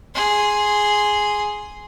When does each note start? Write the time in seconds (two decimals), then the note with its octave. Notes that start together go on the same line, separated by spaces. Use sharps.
0.15 G#4 C6